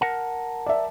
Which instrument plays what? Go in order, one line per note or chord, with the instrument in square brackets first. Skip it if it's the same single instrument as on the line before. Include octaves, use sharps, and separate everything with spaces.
[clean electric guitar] A#4 F#5 A5
[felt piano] D5 E5